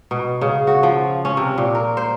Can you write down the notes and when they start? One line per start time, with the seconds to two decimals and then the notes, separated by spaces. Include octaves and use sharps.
0.11 B2
0.41 C#3
0.67 F#4
0.83 F3
1.25 C#4
1.37 C3
1.58 A#2
1.75 A#4
1.97 C5